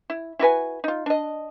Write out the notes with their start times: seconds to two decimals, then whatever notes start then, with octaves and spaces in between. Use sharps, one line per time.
0.10 E4
0.39 E4 F#4 B4 G#5
0.84 D#4 F4
1.06 D4 D#5